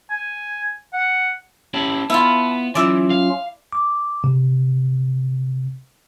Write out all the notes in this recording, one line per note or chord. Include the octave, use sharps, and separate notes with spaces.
G#5
F#5
C#4 E4 G4 A5
B3 E4 F4
E3 F#3 C#4 F4 D5 E5
F5
D6
C3